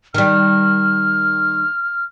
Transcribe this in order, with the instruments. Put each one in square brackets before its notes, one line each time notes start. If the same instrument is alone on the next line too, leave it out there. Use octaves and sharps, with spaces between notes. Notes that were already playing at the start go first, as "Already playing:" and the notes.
[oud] D#3 G3 [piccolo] F6